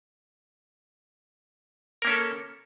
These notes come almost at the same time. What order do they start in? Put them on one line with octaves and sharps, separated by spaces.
A#4 A#3 C#4 A4